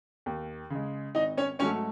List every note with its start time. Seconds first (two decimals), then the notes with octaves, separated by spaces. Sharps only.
0.26 D#2
0.70 C#3 G#3
1.15 G#1 D#4 D#5
1.37 C#4 C#5
1.59 G#2 F#3 A3 C#4 C#5